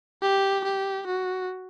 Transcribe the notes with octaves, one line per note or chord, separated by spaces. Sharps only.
G4
G4
F#4